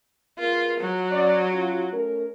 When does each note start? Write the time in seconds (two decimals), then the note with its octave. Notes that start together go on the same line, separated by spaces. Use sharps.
0.39 B3 F4 G#4 A#4
0.80 F#3
1.12 C#4 D5
1.51 C#4 F4 F#4
1.92 A3 C#4 A#4